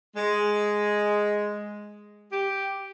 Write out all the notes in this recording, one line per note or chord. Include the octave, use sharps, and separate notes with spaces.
G#3
G4